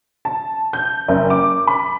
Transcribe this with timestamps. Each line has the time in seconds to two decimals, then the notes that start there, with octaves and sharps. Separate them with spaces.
0.25 A5
0.73 G6
1.08 F#1
1.30 D6
1.67 B5